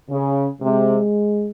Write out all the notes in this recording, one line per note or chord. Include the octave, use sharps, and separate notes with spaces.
C#3
C3 G#3